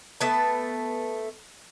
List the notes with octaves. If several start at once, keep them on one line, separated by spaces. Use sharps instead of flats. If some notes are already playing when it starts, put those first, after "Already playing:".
A3 B3 A5